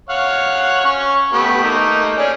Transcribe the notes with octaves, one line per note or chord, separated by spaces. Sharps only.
C#5 F5 F#5
C#4 C#6
A3 B3 G4
A3 A#3 D#4
C#4 G#4 D5